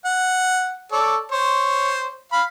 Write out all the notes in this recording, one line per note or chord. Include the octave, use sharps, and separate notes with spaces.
F#5
A4 C#5 D5
C5 C#5
F5 B5